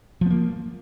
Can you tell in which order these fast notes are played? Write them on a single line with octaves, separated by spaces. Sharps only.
F3 B3 A#3